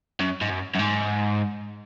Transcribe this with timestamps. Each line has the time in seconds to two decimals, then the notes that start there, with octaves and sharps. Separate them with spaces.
0.20 F#2
0.41 G#2
0.50 F#2
0.75 F#2
0.79 G#2